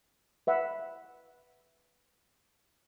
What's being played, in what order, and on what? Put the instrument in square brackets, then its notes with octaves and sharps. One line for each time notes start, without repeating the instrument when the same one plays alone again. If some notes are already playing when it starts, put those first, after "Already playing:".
[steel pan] B4 E5 F#5